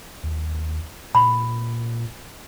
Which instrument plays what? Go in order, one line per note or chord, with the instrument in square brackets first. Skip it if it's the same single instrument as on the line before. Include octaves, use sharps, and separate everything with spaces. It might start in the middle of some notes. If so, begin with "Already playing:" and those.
[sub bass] D#2
[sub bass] A#2 [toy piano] B5